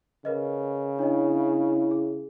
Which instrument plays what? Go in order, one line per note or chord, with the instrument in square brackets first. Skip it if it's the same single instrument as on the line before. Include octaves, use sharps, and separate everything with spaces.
[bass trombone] C#3 [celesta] A#4 B4 D#5
[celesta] D4 C#5 D#5 [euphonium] E4
[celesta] G#4